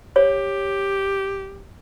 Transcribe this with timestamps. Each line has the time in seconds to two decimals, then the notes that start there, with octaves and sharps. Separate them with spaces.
0.16 G4 C#5